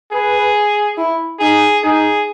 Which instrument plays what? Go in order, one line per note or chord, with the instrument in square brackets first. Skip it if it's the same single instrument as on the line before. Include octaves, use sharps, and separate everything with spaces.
[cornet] G#4 [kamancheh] B4
[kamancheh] E4
[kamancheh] D#4 [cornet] G#4
[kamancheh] D#4 [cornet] G#4